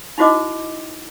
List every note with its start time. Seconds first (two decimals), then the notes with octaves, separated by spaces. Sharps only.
0.18 D#4 E4 F#4 C5 D#5 D6